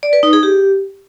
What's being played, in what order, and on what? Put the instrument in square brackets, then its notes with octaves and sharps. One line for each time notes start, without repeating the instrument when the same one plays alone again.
[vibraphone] D5
B4
D#4
G#4
G4